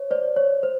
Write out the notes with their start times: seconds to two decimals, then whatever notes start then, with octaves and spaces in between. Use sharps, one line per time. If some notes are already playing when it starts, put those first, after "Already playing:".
Already playing: C5 C#5
0.11 C5 D5
0.36 C#5
0.63 C5